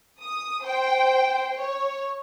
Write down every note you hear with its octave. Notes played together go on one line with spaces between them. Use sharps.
D#6
C5 G5
C#5